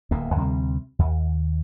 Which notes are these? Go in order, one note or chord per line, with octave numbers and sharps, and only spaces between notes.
D1 D#2 B2 A#3
D2 C3 G3 C4
D#2